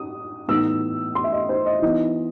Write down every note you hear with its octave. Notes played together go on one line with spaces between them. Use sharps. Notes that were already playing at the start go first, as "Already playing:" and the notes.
Already playing: D#6
A2 E3 B3 D#4 E6
C6
E5
D#5
C5
D#5
E3 B3 D#4 D#5